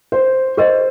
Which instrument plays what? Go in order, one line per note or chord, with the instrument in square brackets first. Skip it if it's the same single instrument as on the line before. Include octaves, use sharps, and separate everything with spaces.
[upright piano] C5
[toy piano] G4 A#4 D#5 [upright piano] C5